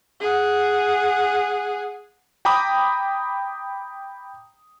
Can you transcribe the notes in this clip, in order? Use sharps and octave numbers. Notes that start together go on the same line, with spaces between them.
G#4 F#5
G5 A#5 B5 D6 D#6